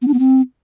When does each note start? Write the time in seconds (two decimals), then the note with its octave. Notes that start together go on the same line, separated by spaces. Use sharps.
0.02 B3
0.08 D4
0.13 B3
0.19 C4